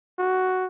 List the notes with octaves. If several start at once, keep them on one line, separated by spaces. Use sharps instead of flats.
F#4